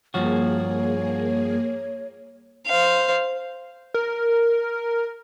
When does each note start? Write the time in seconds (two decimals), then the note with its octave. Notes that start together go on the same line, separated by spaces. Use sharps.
0.14 G2 F3 A#3 F#4 G#4 C#5
2.67 C5 F5
3.94 A#4